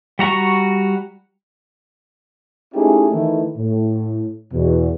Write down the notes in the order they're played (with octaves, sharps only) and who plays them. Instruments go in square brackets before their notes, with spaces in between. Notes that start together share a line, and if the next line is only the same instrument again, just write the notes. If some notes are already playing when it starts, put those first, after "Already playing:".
[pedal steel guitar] G3 F#4 A#5 C#6
[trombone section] A3 C#4 D#4 E4 G4 G#4
D#3 E3 A3 E4
A2
E2 B2